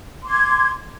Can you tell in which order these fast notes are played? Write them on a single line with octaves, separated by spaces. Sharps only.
C6 D6 G#6